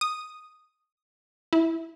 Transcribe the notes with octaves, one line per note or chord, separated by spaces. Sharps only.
D#6
E4